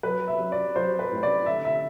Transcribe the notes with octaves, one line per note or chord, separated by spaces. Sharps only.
F#3 B4
E5
F#3
D5
F#3 C5
B4
A2
D5
D3 E5
E5